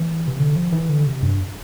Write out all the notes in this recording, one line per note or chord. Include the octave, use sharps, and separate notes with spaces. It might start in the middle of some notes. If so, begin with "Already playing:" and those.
Already playing: E3
C3
D3
F3
E3
D3
C3
G2